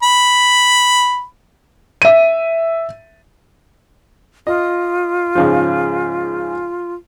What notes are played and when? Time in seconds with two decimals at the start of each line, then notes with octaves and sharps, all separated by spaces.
0.03 B5
2.02 E5 D#7
4.47 F4 D#5
5.35 G#2 C#3 F3